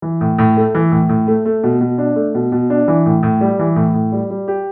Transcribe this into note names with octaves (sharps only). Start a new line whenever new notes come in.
E3
A2
A2
A3
E3
A2
A2
A3
A3
B2
B2
D4
A3
B2
B2
D4
E3
A2
A2
G3
E3
A2
A2
G3
G3
G4